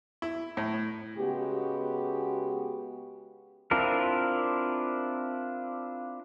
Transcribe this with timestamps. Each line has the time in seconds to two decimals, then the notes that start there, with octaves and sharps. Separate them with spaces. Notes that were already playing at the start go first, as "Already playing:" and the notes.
0.22 E4
0.57 A2
1.17 C#3 G#3 B3 F#4 G4
3.71 C4 D4 E4 F4 A#4